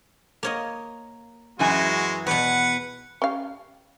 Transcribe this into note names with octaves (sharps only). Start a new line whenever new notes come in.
A#3 C#5 D#5
F#2 E3 G#3 F#4 G#5
E2 B2 B4 F#5
C#4 G4 F5